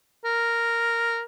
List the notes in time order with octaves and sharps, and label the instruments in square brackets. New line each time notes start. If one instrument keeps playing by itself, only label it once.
[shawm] A#4